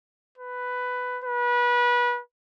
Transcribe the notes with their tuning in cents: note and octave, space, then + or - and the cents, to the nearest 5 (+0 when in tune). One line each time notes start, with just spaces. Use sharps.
B4 +10
B4 -25